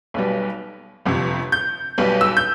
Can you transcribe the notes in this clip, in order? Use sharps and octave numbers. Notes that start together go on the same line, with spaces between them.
B1 B2 G3
G1 F2 C3
G6
B1 B2 G3
E6
G6